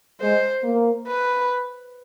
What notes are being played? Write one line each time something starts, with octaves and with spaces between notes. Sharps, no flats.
G#3 C5
A#3
B4